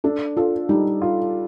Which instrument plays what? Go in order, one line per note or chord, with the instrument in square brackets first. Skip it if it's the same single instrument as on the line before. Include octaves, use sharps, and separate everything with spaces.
[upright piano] D4 [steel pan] A4
[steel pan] F4 [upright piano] A4
[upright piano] G3 [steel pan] D#4
[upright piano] F4